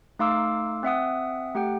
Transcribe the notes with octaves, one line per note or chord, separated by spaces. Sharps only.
A3 D#4 F5 C6 D6 E6
C4 E5 F#5 D#6
A3 G4 F#5 G5